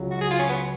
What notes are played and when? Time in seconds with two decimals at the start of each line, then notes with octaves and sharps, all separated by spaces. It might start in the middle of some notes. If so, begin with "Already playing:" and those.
Already playing: C#2 C#3 F#3
0.11 F#4
0.21 G#4
0.31 F4
0.39 C#4
0.49 B3